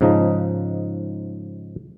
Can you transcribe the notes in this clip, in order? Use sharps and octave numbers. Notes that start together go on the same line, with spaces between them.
G#2 C#3 F3 D#4 D#5